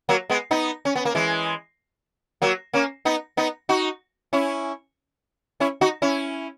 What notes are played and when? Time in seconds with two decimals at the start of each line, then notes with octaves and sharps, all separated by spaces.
0.09 F#3 A#3
0.30 G#3 B3
0.51 B3 D#4
0.85 C#4
0.95 B3
1.05 A#3
1.15 E3 G#3
2.42 F#3 A#3
2.73 A#3 C#4
3.05 B3 D#4
3.37 B3 D#4
3.69 D#4 F#4
4.33 C#4 E4
5.60 C#4 E4
5.81 D#4 F#4
6.02 C#4 E4